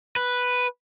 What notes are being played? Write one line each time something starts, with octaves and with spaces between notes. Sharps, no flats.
B4